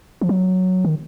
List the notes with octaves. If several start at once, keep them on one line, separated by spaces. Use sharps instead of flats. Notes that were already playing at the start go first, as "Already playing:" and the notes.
F3
F#3
D#3